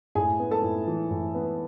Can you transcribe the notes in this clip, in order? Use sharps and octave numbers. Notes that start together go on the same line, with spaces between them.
A2 G#4 G#5
B3
A4 A5
A2
E3
A2
B3